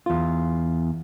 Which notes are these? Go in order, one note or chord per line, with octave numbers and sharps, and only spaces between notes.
E2 F4